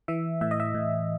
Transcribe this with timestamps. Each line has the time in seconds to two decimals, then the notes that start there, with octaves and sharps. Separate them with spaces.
0.08 E3 E5
0.41 A2 E5
0.51 D#5
0.60 E5
0.75 A2